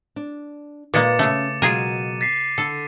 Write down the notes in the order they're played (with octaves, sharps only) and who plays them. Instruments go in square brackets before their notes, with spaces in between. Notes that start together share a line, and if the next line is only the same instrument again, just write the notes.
[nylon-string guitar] D4
[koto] A#2 G#3 A#3 [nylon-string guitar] B4 [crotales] D6 A6 C#7
[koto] C#3 A3 [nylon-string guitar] C#4
[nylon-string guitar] B2 F#3 G#3 [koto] F4 G#4 A#4 [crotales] D#7
[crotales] A6 B6 C7
[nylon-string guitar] D3 [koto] A4